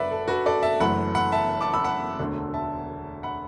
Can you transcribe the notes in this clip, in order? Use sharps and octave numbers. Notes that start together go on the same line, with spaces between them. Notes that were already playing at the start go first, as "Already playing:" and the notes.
Already playing: F#1 F#2 F#3 B4 D5 E5 F#5
A4
F#4 B4
A4 D5
E5 A5
F#1 F#2 E3 A3 F#5 B5
F#5 B5
E5 A5
A5 D6
B5 E6
F#5 B5
E1 D2 D3 A3
E5 A5
F#5 B5